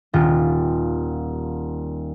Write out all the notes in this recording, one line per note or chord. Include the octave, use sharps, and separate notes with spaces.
D#1 F4 G4